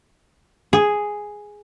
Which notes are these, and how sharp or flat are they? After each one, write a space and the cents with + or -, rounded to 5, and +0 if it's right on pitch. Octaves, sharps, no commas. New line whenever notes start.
G#4 +0